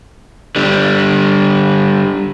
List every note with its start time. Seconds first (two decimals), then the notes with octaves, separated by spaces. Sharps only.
0.56 D3 G3